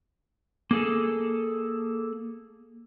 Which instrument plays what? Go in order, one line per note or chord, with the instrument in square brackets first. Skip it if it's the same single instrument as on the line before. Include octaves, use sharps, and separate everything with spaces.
[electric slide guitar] A#3 G#4 A4